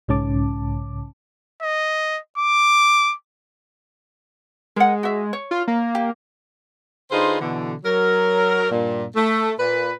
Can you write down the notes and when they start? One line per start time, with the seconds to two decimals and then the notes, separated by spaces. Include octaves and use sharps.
0.08 B1 G#2 C#3 C#4 A5 D6
1.62 D#5
2.38 D6
4.76 G#3 A#4 F#5
5.03 F#4 E5
5.33 C#5
5.51 F4
5.68 A#3
5.95 G4
7.11 D3 D#4 F4 G#4 B4 C5
7.40 B2 D3 E3
7.84 F#3 A#4
8.71 G2 A#2
9.15 A3
9.59 A#2 B4